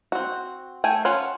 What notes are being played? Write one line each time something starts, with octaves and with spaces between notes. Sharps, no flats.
C4 F#4
A3 G5 G#5
C#4 F4 C5 F#5